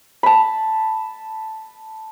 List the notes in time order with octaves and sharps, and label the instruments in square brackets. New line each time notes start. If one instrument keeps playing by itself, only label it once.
[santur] A5 B5